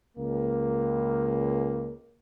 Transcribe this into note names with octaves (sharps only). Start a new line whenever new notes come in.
C#2 A#3